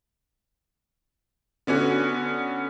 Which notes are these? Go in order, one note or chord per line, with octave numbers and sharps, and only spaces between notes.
D3 B3 C#4 F#4